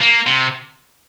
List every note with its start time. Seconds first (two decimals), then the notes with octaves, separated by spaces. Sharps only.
0.01 A#3
0.27 C3